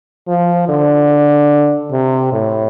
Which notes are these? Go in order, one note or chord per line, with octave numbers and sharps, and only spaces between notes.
F3
D3
C3
A2